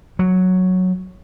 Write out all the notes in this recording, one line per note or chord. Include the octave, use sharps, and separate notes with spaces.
F#3